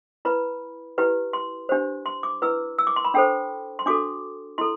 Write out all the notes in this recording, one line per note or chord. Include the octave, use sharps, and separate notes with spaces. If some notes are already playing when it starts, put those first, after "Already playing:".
E4 B4 B5
E4 G4 B4
C6
D4 G4 C5
C6
D6
E4 B4 E6
E6
D6
C6
B5
D4 A4 C5 G5
C6
D4 F#4 A4 D6
E4 A4 C6